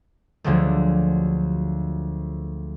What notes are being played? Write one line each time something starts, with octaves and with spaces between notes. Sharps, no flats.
D2 D3 F3 F#3 G#3 A3